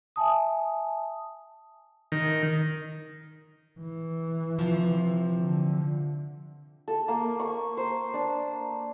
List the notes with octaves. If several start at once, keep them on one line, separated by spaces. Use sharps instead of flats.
E5 G#5 A5 D#6
D#3
E3
C3 F3
D3
A4
A#3
C#6
C5
D4